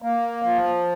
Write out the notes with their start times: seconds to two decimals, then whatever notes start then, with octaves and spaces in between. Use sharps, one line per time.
0.02 A#3
0.42 F3